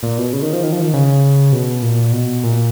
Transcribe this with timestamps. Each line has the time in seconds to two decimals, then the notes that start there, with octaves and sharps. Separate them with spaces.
0.03 A#2
0.18 B2
0.33 C#3
0.42 D#3
0.53 F3
0.63 D#3
0.72 F3
0.82 D#3
0.93 C#3
1.53 B2
1.82 A#2
2.12 B2
2.44 A#2